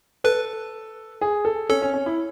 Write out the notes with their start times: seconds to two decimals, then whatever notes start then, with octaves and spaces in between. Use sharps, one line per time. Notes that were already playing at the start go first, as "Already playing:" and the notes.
0.24 A4 B4
1.21 G#4
1.45 A4
1.70 C#4 A4
1.82 C#4
1.94 C#4
2.06 E4